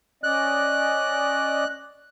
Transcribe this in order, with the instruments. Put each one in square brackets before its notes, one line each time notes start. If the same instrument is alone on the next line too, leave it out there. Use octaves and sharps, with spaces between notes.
[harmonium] C#4 D5 D#5 [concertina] F#6